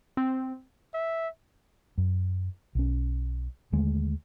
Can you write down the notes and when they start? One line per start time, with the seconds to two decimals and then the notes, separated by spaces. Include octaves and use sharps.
0.17 C4
0.94 E5
1.98 F#2
2.75 B1 C#4
3.72 D#2 D3 G#3 A3